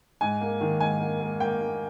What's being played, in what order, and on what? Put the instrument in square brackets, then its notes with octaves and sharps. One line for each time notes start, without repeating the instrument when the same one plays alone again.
[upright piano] G#2 G#5
A#3
D#3
G#2 G#5
A#3
A#3
A#3 G5
A#3